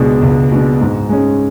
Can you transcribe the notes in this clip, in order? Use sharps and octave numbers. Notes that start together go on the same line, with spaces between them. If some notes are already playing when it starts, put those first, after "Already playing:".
Already playing: C#2 B2 G#3 D4
C#2
B2 G#3 D4
G#2
G#3 C#4